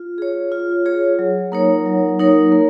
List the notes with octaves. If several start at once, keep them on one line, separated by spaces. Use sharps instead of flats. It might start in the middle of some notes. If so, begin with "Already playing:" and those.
Already playing: F4
G#4 C#5
F4
G#4 C#5
F#3
A#3 D#4 A#4 C#5
F#3
A#3 D#4 A#4 C#5
A#3